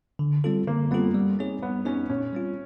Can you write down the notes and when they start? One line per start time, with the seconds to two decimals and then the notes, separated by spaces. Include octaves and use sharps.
0.19 D3
0.44 G3 C4 F4 A4
0.67 D3 A#3
0.91 G3 B3 C4 F4 A4
1.15 G3
1.39 C4 D#4 G#4 C#5
1.62 G3 B3
1.86 C4 C#4 D#4 G#4 C#5
2.10 A#2 C#4
2.33 G3 C4 F4